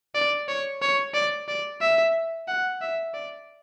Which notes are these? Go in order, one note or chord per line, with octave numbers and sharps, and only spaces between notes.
D5
C#5
C#5
D5
D5
E5
F#5
E5
D5